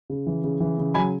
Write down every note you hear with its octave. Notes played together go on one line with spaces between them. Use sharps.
C#3
E3
C#3
E3
C#3
F#3 G#5 B5